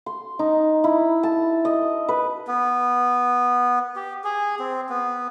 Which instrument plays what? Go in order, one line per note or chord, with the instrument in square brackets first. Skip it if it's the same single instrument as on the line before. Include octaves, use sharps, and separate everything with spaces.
[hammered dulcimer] C6
D#4
E4
A5
D#5
B4
[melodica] B3
G4
G#4
C4
B3